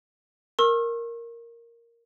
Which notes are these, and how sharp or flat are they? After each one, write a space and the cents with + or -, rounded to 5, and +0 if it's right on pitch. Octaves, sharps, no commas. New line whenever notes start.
A#4 +0 C#6 -40 E6 +0